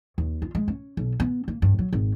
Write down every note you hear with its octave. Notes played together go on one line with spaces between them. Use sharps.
D#2
F4
G#3
C#4
B1
B3
A#3
G2
F#3
G#1